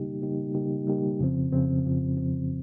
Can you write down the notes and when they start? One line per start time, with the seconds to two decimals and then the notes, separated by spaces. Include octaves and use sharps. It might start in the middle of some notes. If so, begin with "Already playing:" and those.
Already playing: C#3 G3 A#3 D#4 G4
0.22 C#3 G3 A#3 D#4 G4
0.54 C#3 G3 A#3 D#4 G4
0.87 C#3 G3 A#3 D#4 G4
1.19 F2 C#3 F3 C4
1.52 F2 C#3 F3 C4
1.85 F2 C#3 F3 C4
2.17 F2 C#3 F3 C4